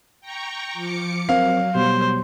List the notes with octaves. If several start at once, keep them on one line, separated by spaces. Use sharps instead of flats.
G5 A#5 C#6
F3 D6 C#7
F#3 C4 A#4 C5 F5
B2 G3 C5